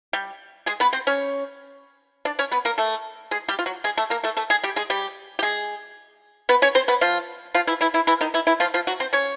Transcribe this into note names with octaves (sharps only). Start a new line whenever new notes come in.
G3 G4
G#3 G#4
B3 B4
C4 C5
C#4 C#5
D4 D5
C#4 C#5
B3 B4
A#3 A#4
A3 A4
G#3 G#4
G3 G4
F4
F#3 F#4
G#3 G#4
A3 A4
A#3 A#4
A3 A4
A3 A4
G#3 G#4
G3 G4
G#3 G#4
G3 G4
G4
G#3 G#4
B3 B4
C#4 C#5
C4 C5
B3 B4
F3 F4
F3 F4
E3 E4
E3 E4
E3 E4
E3 E4
D#3 D#4
E3 E4
E3 E4
F3 F4
F3 F4
F#3 F#4
C4 C5
C#4 C#5